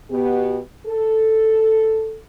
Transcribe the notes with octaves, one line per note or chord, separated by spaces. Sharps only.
B2 B3 G4
A4